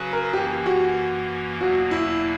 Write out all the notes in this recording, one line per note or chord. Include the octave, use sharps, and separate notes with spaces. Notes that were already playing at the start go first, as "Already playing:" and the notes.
Already playing: C#3 F#3 C#4 F#4 B4
A#4
F#2 E3 A#3 C#4 G4
F#4
E2 B2 F#3 A#3 F#4
E4